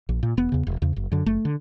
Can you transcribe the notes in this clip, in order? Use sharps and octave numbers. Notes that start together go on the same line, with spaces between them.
A#1
A#2
E1 B3
E2 C#3
E1
E2 C#3
F#1
F#2 D3
F#1 A3
D3